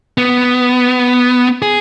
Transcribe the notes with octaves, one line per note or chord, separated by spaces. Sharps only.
B3
G#4